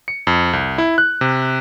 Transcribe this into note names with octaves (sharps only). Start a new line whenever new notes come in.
C#7
F2
C2
E4
F#6
C3